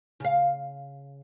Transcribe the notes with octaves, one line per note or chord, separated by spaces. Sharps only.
C#3 F5